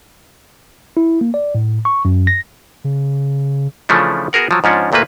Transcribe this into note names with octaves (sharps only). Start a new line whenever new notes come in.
E4
A#3
D5
A2
C#6
F#2
A#6
C#3
C#3 E3 F3 A3 C#4 D4
B3 F#4 G#4 A#4 F#5
F3 F#3
G#2 F3 C#4 D4 F#5
D2 A#2 A3 A#3 B4